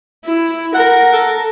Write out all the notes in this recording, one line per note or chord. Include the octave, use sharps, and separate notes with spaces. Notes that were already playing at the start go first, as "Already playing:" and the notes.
E4
A#4 F#5
A4